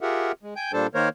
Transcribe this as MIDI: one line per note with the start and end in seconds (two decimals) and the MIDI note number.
0.01 0.32 65
0.01 0.32 67
0.01 0.32 68
0.01 0.32 70
0.01 0.32 76
0.01 0.32 78
0.43 0.54 56
0.56 0.72 79
0.56 0.72 80
0.56 0.72 91
0.73 0.87 46
0.73 0.87 55
0.73 0.87 62
0.73 0.87 69
0.73 0.87 72
0.73 0.87 81
0.94 1.09 51
0.94 1.09 58
0.94 1.09 70
0.94 1.09 72
0.94 1.09 73